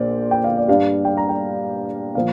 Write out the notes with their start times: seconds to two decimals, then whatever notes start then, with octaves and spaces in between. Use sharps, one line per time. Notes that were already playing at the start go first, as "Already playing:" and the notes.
Already playing: A#1 A#2 C5 D5
0.31 G5
0.44 F5
0.57 D5
0.68 G2 G3 D4 F5
1.05 G5
1.17 A#5
1.29 G5
2.15 A#2 F3 F5